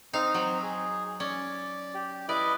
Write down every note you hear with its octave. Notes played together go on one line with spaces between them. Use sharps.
C4 D#4 F5
F#3
G#4
C#4 D5
G4
E4 B4 D5 D#5